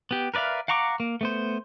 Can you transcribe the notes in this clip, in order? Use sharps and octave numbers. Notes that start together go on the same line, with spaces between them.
B3 G4
A#4 B4 D5 E5 F5
F5 F#5 A#5 C#6 D6
A#3
A3 B3 C5